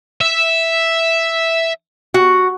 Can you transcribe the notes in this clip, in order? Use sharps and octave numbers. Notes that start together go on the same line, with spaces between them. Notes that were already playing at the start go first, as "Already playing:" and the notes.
E5
F#4